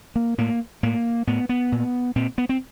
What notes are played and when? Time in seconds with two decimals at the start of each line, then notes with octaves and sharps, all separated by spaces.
0.16 A#3
0.38 A2 A#3
0.83 A2 A#3
1.27 A2 B3
1.49 B3
1.72 A#2
2.16 A#2 C4
2.38 B3
2.49 C4